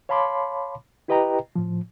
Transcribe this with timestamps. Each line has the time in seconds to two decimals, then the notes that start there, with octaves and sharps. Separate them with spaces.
0.09 C#5 F5 A5 B5 C6 D6
1.08 E4 G4 B4 D#5 G5 A#5
1.56 A2 F3